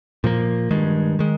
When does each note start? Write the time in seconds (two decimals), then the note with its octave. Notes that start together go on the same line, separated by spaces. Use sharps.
0.24 A#2 F3 A#3
0.71 G2 D#3 G#3
1.19 D#3 G#3